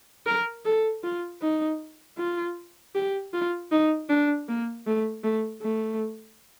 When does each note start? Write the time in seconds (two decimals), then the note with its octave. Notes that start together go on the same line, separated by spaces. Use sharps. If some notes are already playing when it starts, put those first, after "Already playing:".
0.26 A#4
0.65 A4
1.04 F4
1.41 D#4
2.18 F4
2.95 G4
3.33 F4
3.71 D#4
4.09 D4
4.48 A#3
4.87 A3
5.24 A3
5.62 A3